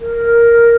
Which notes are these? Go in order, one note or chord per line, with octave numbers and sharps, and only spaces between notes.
A#4